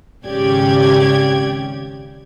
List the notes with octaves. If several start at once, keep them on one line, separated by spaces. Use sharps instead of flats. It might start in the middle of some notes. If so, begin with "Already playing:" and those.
G#1 C#3 G4 D5 G5 G#6